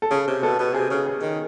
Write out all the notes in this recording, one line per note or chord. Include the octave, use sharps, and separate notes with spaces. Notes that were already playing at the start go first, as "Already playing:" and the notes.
A4
C#3 G#4
C3
B2 A4
B2
C3 G#4
C#3
G#4
D#3